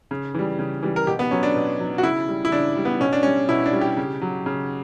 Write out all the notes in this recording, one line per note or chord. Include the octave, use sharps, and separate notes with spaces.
C#3
E3 G3
C#3
E3 G3
A#4
B2 G4
B3
F#3 C#4
D4
B2
F#3
F#4
C#3 E4
G3
E4
C#3 D4
G3
B3
B2 C#4
D4
G3 C#4
B2 E4
D4
G3
G4
C#3
F#3
C#3